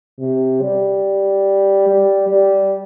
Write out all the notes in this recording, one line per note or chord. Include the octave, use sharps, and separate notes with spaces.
C3
G3
G3
G3